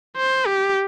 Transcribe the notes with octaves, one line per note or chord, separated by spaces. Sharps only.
C5
G4